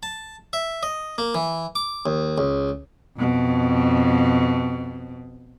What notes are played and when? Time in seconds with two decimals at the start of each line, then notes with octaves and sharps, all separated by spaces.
0.03 A5
0.53 E5
0.83 D#5
1.18 A#3
1.35 E3
1.75 D6
2.06 D#2
2.38 C#2
3.18 F2 B2